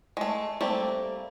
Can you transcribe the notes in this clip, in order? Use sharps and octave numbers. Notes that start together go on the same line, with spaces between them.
G#3 A3
G3 A3 A#3 C4